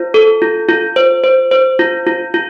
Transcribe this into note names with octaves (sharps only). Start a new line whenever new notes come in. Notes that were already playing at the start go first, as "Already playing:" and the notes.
Already playing: F4 C5
A4
F4
F4
C5
C5
C5
F4
F4
F4